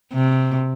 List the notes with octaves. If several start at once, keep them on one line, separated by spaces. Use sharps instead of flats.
C3